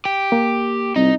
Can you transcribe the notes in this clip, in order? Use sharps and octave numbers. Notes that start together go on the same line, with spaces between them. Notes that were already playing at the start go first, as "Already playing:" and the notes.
G4
A#3
C2 D#4